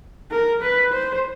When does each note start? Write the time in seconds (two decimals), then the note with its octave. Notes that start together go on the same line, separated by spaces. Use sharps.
0.31 A#4
0.62 B4
0.93 C5